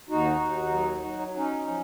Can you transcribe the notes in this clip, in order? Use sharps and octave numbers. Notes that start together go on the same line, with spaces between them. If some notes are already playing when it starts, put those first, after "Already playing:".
D#2 D#4 F#4
D#2
F#3
F#3
C#4 D#4
F3